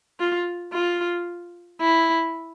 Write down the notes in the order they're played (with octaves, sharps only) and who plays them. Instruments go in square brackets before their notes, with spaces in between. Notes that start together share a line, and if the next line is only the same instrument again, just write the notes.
[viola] F4
F4
E4